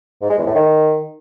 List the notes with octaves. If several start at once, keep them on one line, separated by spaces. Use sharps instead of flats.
G#2
G#3
E2
A2
D#3